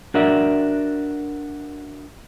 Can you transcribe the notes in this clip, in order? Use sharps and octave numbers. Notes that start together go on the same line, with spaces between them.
D4 F#4 A#4 D5 E5